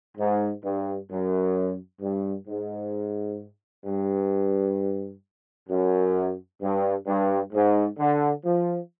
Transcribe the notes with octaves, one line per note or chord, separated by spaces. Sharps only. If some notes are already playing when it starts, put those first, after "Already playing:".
G#2
G2
F#2
G2
G#2
G2
F#2
G2
G2
G#2
D3
F3